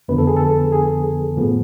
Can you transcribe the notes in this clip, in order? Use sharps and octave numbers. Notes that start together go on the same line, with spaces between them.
F2 D3 F3 B3 B4
A4
G#4
A4
G#4
A2 F3 B3